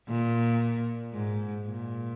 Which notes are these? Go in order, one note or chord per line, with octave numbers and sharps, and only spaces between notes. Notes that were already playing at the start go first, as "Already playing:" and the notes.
A#2
G#2
A#2